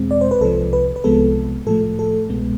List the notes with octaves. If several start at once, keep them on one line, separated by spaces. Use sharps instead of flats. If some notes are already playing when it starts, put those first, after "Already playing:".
Already playing: E2 B2 G#3 C4
D5
C5
B4
C2 C3 F3 A4
B4
B4
C2 C3 F3 G#3 B3 A4
A2 F3 A3 A4
A4
C2 B2 G#3 B3